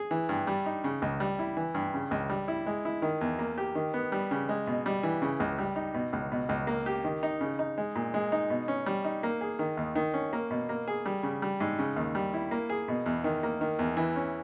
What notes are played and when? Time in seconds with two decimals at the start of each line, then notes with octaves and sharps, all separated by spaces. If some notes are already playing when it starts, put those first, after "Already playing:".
Already playing: G#4
0.11 E3
0.29 G2
0.47 G3
0.66 D#4
0.84 C#3
1.02 C#2
1.20 G3
1.39 E4
1.57 E3
1.75 G2
1.94 C#3
2.11 C#2
2.29 G3
2.48 E4
2.66 G#3
2.85 E4
3.02 D#3
3.21 E2
3.39 A#3
3.58 G4
3.75 D#3
3.94 B3
4.12 G3
4.31 C#3
4.49 G#3
4.67 B2
4.86 G3
5.03 E3
5.22 C#3
5.40 C#2
5.58 G3
5.76 D#4
5.94 B2
6.13 C#2
6.32 B2
6.49 C#2
6.67 A#3
6.86 G4
7.04 D#3
7.23 D#4
7.41 C#3
7.59 D#4
7.78 G#3
7.96 A#2
8.14 G#3
8.32 D#4
8.50 B2
8.68 C#4
8.86 G3
9.04 D#4
9.23 A#3
9.41 G#4
9.59 D#3
9.77 D#2
9.95 D#3
10.14 C#4
10.33 A#3
10.51 B2
10.69 A#3
10.88 G#4
11.06 G3
11.23 C#3
11.42 G3
11.60 G#2
11.79 C#3
11.96 D#2
12.15 G3
12.34 E4
12.51 A#3
12.70 G#4
12.88 B2
13.06 E2
13.24 D#3
13.43 A#3
13.61 D#3
13.79 E2
13.97 E3
14.16 C#4